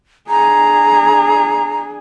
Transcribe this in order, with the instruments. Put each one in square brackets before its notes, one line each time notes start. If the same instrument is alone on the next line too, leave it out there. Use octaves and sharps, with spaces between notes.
[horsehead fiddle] D4 G#4 [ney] A#5